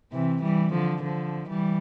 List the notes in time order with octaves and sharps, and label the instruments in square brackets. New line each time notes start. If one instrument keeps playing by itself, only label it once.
[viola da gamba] C3 E3
E3 G3
D3 F3
D3 F3
E3 G3